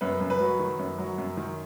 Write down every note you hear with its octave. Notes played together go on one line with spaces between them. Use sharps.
F#2 B4
F#2
B4
F#3
D#3
F#2
F#3
F#2
D#3